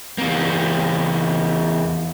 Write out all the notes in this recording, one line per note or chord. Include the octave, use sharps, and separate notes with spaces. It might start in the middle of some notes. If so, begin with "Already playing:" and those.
E2 A#3